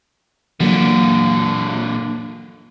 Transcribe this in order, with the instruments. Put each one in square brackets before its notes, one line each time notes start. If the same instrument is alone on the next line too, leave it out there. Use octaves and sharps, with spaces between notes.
[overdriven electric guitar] A#2 D3 [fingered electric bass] E3 F#3 A#3